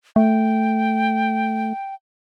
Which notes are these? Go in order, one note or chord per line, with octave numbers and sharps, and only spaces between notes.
A3 G5